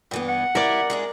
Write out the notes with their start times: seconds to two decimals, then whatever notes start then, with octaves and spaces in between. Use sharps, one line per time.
0.11 G2 E3 B3
0.28 F#5
0.55 E4 A#4 D5
0.90 G#3 D4 G#4